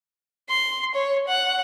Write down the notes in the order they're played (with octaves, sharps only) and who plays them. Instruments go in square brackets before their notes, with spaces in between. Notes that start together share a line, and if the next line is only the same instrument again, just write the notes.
[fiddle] C6
C#5
F#5